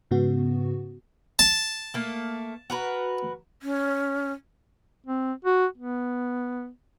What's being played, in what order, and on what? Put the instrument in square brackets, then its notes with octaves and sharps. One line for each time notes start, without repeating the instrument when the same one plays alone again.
[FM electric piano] G#2 C#3 B3 F#4
[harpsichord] A5
[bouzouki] A3 A#3
F#4 A#4 B4
[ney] C#4
[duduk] C4
F#4
B3